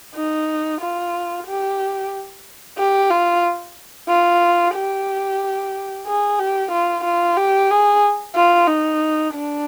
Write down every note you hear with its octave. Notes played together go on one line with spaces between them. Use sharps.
D#4
F4
G4
G4
F4
F4
G4
G#4
G4
F4
F4
G4
G#4
F4
D#4
D4